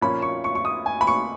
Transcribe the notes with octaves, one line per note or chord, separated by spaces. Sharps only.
A#2 F3 A#3 C#4 B5
C#6
C#6
C#6
D#6
G#5
B5
C#6